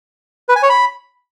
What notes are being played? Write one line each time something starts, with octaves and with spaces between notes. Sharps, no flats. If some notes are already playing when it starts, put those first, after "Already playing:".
B4
G#5
C#5
B5